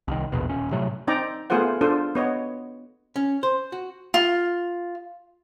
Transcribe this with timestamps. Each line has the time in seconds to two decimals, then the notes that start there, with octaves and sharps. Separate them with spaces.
0.08 C2 D#3
0.32 A#1 E2 B2
0.49 D#1 C#4
0.71 A2 C3 F#3 A3
1.07 C4 D#4 D5 G5 A#5
1.50 A3 B3 F4 G#4 C5 F#5
1.81 D4 F4 A4 C5
2.15 B3 C#5 D#5
3.16 C#4
3.43 C5
3.72 F#4
4.14 F4